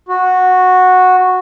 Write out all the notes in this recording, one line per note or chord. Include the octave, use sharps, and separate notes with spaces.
F#4